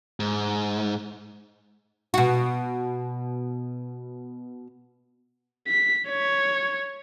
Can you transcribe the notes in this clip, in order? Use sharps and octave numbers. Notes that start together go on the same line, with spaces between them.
G#2
B2 F#4
B6
C#5